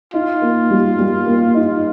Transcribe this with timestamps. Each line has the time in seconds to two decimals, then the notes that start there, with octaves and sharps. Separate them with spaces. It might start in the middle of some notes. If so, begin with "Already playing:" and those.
0.14 D#4 F4
0.42 A#3
0.70 G3
0.99 G3
1.27 A#3
1.55 D#4